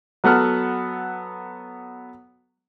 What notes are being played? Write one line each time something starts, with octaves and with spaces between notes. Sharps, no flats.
F#3 B3 A4 F#5 F6